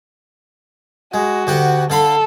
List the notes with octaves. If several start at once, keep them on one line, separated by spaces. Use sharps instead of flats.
G#3 F#4
D2 G4 F#5
D3 A4 F5 B5